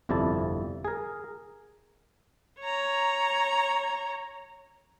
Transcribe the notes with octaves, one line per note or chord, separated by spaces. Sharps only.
G1 F2 C3 E4 D5 A5
G#4 A#4
C#5 A#5